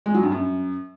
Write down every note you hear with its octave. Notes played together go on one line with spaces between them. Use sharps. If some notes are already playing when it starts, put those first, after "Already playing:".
G#3
F#3
G2
F#2